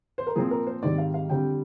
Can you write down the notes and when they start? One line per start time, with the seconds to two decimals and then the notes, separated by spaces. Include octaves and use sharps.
0.18 C5
0.27 A#4
0.36 A#2 F3 C4 F4 G#4
0.51 A#4
0.67 C5
0.82 G#2 D#3 G3 C4 D5
0.98 F5
1.14 F5
1.29 F2 D3 G3 C4 G5